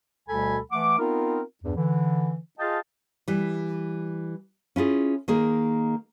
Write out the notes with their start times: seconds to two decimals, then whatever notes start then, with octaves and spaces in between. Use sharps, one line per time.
0.29 D2 B2 G3 A4 G#5 B5
0.71 E3 A3 F#5 D6
0.99 B3 C4 D#4 F4 A#4
1.64 E2 G2
1.76 D3 E3
2.59 F4 G#4 D#5 F5 G5 A5
3.28 E3 G3
4.76 C#4 E4 F4 G#4
5.28 D#3 A#3 G#4